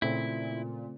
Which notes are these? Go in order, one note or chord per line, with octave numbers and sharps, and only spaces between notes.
A#2 C#3 A3 C4 E4